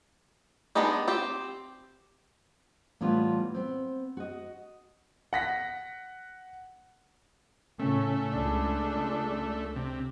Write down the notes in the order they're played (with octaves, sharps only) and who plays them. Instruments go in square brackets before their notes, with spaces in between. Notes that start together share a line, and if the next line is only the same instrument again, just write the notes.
[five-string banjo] G#3 B3 D4 D#4 G4
C4 G4
[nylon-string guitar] A2 E3 G3 B3 F4
B3 C4
F#4 D#5
[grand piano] F#5 A#6 B6
[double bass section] A2 C#3 C#4 [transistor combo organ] A3
[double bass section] C#2 [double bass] G#3 D4
[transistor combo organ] C3